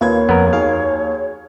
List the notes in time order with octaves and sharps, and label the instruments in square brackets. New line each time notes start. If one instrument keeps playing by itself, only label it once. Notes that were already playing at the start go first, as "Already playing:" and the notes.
[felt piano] D#2 A#3 G#6 [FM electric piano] F4 B4 [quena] C#5
[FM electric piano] F2 [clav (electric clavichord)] B3 A#4
[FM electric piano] D#4 F#4 G#4 [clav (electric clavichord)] F5